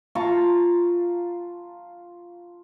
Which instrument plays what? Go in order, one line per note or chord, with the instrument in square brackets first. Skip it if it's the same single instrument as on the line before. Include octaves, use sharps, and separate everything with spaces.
[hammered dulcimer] F4 A5 A#5 C#6